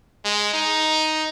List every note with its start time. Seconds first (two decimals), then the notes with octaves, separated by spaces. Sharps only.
0.25 G#3
0.53 D#4